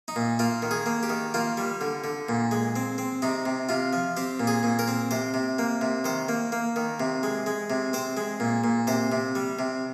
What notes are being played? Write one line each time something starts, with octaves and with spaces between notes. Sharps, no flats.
D#4
A#2
A#3 F4
D#3
G#4
A#3
G4
D#3
A#3 F4
G3
D3
D3
A#2
G#3
C4
C4
C3 D#4
C3
C3 F4
F3
C4 G4
A#2
G#4
A#2
A#4
C4
C3 C5
C3
A#3
C3
D#3 C5
A#3
A#3
D#3
C3
G#3
G#3
C3
C4 C5
G#3
A#2
A#2
C3 C5
C3
G3
C3